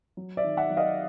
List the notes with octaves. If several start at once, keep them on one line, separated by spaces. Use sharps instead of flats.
F#3
D5 E5
D#3
E5 F#5
F#3
D#5 F5